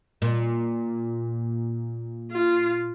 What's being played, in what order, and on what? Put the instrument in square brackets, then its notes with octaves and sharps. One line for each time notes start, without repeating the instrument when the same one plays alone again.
[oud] A#2
[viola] F4